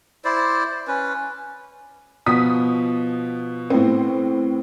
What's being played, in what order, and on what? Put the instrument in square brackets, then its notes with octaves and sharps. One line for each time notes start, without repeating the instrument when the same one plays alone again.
[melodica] E4 C5 D5
C#4 B4
[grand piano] B2 F3 B3 [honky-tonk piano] D#6 B6
[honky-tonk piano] A2 B3 C4